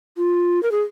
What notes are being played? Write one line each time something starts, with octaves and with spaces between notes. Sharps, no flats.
F4
A#4
G#4